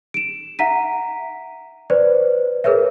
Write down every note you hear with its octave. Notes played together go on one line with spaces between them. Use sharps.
D7 E7
E5 F#5 A#5 B6 D#7
B4 C5 D5
G#4 A#4 B4 C#5 E5